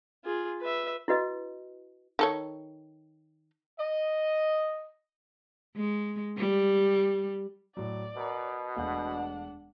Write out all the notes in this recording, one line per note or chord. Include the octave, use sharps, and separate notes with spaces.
F4 G#4
B4 E5
E4 F#4 B4 D#5
D#3 A4 C#5
D#5
G#3
G3
A2 F#3 D5
B2 A#4 F#5 A#5
E1 A3 D4 F5 F#5